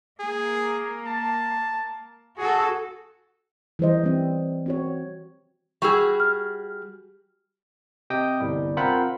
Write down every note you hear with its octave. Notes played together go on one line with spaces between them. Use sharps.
A#3 G#4
A5
F#4 G#4 A4
E3 G3 C5 D#5
G3 C4
C4 F#4 C#5
G3 F#4 G#4 C#6 E6
F6
C3 G4 D#5 G5 D#6
G1 C2 G3
C4 F4 A#4 C5 F#5 B5